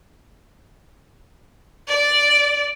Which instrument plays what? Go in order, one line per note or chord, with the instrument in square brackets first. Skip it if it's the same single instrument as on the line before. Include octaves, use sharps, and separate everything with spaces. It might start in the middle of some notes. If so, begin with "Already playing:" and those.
[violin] D5